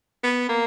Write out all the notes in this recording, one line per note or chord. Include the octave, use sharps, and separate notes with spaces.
B3
A#3